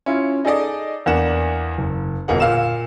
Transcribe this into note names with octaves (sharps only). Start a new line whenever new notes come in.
C#4 E4 F4
D#4 G#4 A4 D5 D#5
E2 A#3 D4 F#5 E7
F#1
G1 B2 A#3 G#4 F#5
A#2 F5 E6 E7